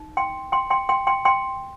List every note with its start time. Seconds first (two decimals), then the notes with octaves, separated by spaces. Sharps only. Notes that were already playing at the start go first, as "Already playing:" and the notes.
Already playing: D#4
0.17 G5 C6
0.52 G5 C6
0.70 G5 C6
0.89 G5 C6
1.07 G5 C6
1.25 G5 C6